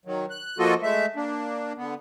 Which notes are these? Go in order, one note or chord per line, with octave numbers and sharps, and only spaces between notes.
D#3 F#3
F#6
F3 A#3 F4 F#4 A4 D#5
G#3 A3 E5
A#3 D4
D3 B3